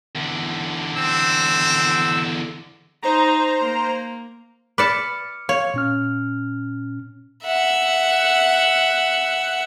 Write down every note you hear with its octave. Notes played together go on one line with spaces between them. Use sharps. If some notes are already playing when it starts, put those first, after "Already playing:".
E2 D3
C4 E6
D#4 C5 A#5
A#3
B4 D5 A5 D6 F6 C#7
C#5 F5
A#2 C#4 F6
E5 F#5